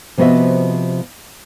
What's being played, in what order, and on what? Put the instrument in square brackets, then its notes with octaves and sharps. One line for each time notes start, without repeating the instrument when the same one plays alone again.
[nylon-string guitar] C3 F3 B3 F#4 D#5 E5